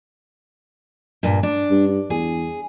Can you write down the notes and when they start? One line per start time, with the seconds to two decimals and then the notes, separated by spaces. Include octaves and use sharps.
1.23 G2 A#2
1.43 D4
1.71 G2
2.10 E2 G#4